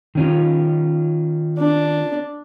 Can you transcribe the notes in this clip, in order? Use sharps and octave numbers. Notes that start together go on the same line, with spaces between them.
D#3 C#4 F4
D4